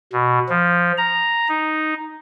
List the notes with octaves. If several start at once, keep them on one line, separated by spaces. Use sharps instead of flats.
B2
F3
A#5
D#4